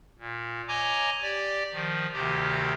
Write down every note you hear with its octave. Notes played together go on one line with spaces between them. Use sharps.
A#2
C#5 D#5 G#5 A#5 D6
G4 D5
D#3 F3
D2 C3 D#3 G4